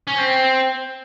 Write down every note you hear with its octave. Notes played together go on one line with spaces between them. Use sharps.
C#4
C4